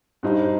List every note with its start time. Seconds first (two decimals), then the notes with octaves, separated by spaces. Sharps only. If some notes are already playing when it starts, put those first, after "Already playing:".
0.23 G2 G3 D#4 C5